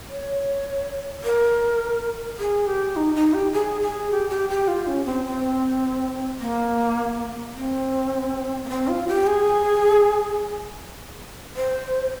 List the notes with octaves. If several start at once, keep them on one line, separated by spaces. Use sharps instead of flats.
C#5
A#4
G#4
G4
D#4
D#4
G4
G#4
G#4
G4
G4
G4
F4
C#4
C4
C4
A#3
C4
A#3
C4
F4
G4
G#4
C5